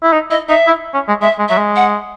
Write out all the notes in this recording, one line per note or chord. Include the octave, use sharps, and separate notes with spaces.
E4
D#4
E4 D#5
D#4 E5
E4
C#4
G#3
G#3 E5
G#3
F#3 E5
G#3
F#5